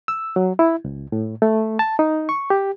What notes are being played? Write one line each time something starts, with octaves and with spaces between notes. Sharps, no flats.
E6
F#3
E4
C#2
A2
A3
A5
D#4
C#6
G4